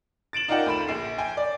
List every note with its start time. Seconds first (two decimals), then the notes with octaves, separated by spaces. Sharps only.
0.33 A6 D7 E7 F#7
0.48 D#4 F4 A#4 D5 F#5 G5
0.66 D2 B5 E7
0.88 A#1 C7
1.18 G5 G#5
1.37 D5